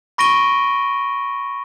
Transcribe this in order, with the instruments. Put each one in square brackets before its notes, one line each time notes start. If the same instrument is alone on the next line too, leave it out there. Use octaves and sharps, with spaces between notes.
[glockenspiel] B5 C#6 A#6 D7 D#7 G7